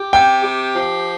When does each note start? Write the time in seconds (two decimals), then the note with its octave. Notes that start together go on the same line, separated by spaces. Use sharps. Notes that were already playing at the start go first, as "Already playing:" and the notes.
Already playing: G4
0.12 C3 G5
0.44 G4
0.76 F3